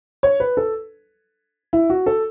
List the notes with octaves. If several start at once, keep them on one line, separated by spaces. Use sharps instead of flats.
C#5
B4
A4
E4
F#4
A4